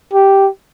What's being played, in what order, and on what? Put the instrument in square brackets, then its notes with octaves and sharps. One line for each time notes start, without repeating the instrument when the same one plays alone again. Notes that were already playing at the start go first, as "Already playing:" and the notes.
[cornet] G4